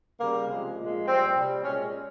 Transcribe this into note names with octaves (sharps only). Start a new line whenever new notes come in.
C#3 G3 A#3
C3 F3 G#3
A#2 F3 G#3
A#2 G3 C4
C3 G3
A#2 G#3 C#4